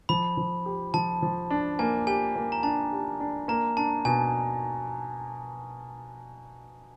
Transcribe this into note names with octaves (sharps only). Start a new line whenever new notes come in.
F3 B5
F3
G4
F3 A5
F3
D4
A#3 G#5
G4 G#5
A#3
A#5
D4 A5
G4
D4
A#3 A#5
D4 A5
B2 G#5